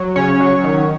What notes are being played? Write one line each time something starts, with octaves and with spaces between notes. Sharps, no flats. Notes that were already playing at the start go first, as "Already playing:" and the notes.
Already playing: F#3
C#3 C#4 C#5
F#3
D#3